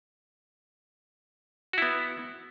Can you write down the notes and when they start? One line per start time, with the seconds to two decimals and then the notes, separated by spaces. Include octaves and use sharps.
1.73 F#4
1.78 E4
1.82 B3